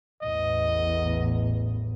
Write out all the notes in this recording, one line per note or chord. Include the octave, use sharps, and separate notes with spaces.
A1 E2 D#5